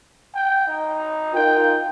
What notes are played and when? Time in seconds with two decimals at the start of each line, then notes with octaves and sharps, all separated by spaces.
0.35 G5
0.67 D#4
1.34 D#4 F4 A#4 G5